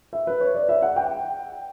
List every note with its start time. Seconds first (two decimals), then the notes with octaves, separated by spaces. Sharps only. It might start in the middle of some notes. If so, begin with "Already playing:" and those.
0.13 E5
0.27 B4
0.41 C#5
0.55 D5
0.69 E5
0.82 F#5
0.96 G5